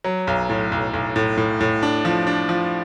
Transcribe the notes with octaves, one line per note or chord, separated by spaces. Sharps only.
F#3
B1
A2
B1
B1
A2
A2
A2
D4
F3
D4
F3